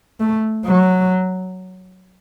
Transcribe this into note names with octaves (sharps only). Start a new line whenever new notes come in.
A3
F#3